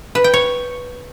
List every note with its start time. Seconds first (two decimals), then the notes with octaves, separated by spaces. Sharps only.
0.15 B4
0.24 G5
0.34 C#5